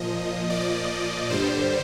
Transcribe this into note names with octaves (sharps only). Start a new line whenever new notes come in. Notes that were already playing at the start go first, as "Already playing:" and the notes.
Already playing: A#2 F3 D#5
D5
G2 D3 G3 C5